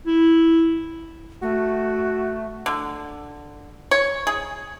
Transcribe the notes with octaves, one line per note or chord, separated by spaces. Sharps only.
E4
A3 F#4
D3
C#5
G#4